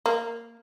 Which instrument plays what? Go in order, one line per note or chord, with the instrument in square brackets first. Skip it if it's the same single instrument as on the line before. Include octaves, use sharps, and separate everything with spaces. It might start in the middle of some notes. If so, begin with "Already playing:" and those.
[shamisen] A#3